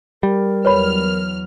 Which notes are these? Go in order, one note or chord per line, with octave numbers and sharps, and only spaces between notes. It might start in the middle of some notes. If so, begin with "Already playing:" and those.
G3 A#4
E2 F#3 B4 C#5 B5 F6